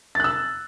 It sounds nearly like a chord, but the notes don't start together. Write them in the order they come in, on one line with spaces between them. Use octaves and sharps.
A6 F#6 E6